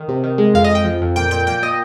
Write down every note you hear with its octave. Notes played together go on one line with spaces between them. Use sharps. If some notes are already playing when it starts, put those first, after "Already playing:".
Already playing: D#3
C3
D#3
G#3
F2 F5
D#5
F2 G5
F3
F2
A#2 G5
A#2 G5
A#2 G5
A#2 D#5